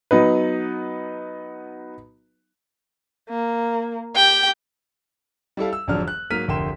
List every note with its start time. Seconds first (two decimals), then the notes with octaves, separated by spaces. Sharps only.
0.11 F#3 B3 D#4 B4
3.29 A#3
4.16 G4 G5
5.57 G3 E4 A4 F5
5.73 E6
5.87 E1 F2 D3 F#3 D4 F6
6.08 F#6
6.30 G#2 F#3 A#3 F6 B6 D#7
6.48 F1 D2 A#4 G5 C6 E7